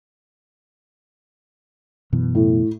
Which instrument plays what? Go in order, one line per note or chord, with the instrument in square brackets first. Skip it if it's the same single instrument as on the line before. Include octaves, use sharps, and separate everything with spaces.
[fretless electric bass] F#2 B2 E3
[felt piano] A2